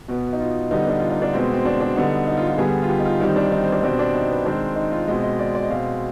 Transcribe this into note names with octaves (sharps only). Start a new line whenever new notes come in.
B2 B3
D#4
F4
D3 G3 B3 D#4
D4
F4
D#4
D4
B2 G#3 B3 C4
C4
D4
D4
D3 G3 B3 D#4
D#4
F4
F4
D3 G3 B3 G#4
F4
G4
D#4
F4
D#3 G3 C4 D#4
D4
D#4
C4
D4
B2 G3 C4 D4
D4
D#4
B4
D#3 G#3 C4 D4
D#4
F4
B2 G#3 C4 D#5
D#5
D5
D5
D#5
B2 G#3 C4 F5